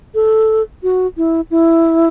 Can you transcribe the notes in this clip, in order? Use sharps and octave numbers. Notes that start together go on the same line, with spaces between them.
A4
F#4
E4
E4